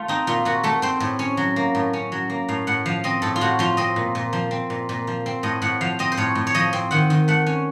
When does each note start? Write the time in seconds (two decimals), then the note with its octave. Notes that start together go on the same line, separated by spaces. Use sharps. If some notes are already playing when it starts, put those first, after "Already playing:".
Already playing: A3 F4
0.08 C4 D#4
0.27 A#2 F4
0.45 A#2 F#4
0.64 A3 A4
0.82 C4 C5
1.00 A2
1.19 C#4
1.37 F#3
1.56 A#3
1.75 A2
1.93 C#4
2.12 F#3
2.30 A#3
2.48 A2 F5
2.67 A2 F#5
2.86 F3 F5
3.04 C4 D#5
3.22 A2 A4
3.36 F4
3.41 A2 F#4
3.59 F3 F4
3.77 C4 D#5
3.96 A#2
4.15 A#2
4.33 F3
4.51 C4
4.70 A#2
4.89 A#2
5.07 F3
5.26 C4
5.43 A2 D#5
5.62 A2 F#5
5.81 F3 F5
5.99 C4 D#5
6.12 C5
6.17 A2 C#5
6.35 A2
6.47 C#5
6.54 F3 D#5
6.73 C4
6.91 D#3 F#5
7.10 D#3
7.28 A3 F#5
7.46 C#4